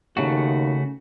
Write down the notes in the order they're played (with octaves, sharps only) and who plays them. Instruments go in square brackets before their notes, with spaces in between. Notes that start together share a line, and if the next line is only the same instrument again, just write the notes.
[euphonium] D#2 [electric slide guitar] C#3 A3 F#4